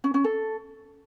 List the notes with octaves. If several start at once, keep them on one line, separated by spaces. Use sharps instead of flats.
C#4
C#4
A4